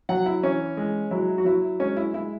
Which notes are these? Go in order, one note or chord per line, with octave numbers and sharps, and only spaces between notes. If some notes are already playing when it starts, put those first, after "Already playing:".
F#3 F#5
E4
E3 C#4
G#3
F#3 E4
F#4
F#3 E4
G#3 C#4
E4
G#3 E4